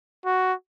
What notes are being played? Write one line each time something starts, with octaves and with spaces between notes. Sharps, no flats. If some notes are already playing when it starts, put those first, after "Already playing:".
F#4